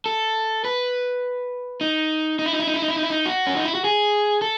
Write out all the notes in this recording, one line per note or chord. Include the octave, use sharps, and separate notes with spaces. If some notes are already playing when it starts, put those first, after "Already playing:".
A4
B4
D#4
D#4
E4
D#4
E4
D#4
E4
D#4
E4
D#4
E4
D#4
F#4
C#4
D#4
E4
F#4
G#4
A4